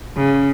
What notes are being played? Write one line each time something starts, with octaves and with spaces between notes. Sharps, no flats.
C#3